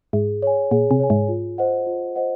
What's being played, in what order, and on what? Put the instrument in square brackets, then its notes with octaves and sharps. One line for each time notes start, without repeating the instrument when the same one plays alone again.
[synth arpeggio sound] G#2 [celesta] G#4
[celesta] C#5 G#5
[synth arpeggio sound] A#2 [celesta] G#4
[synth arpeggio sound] C3
[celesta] C#5 G#5
[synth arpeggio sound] G#2
[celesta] F4
C5 D#5 F#5
F4
C5 D#5 F#5